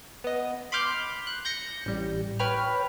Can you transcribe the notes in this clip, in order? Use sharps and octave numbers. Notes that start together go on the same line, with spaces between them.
B3 D#5
B5 C6 D6 F6 G6
F#6
G6 A#6 C#7
A1 G3
B4 C#5 G5 B5 F6